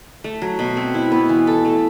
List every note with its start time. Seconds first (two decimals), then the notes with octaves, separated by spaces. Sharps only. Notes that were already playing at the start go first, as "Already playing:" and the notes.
0.24 A3
0.42 F#3
0.59 B2
0.77 C4
0.94 E4
1.12 B3
1.29 E3
1.47 A4
1.65 A3